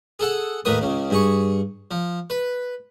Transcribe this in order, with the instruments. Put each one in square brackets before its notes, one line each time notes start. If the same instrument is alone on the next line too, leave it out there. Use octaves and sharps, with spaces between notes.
[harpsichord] G#4 A4 F#5
D#2 A2 A#3 B4 D#6
C#2 C#3
G2 G#4 C#6
F3
B4